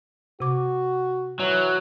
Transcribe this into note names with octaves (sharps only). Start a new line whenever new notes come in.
C3 F#4 D6
E3 F#3